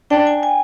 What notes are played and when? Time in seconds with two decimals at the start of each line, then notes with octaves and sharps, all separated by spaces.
0.10 D4 G5
0.27 G#5
0.43 G#5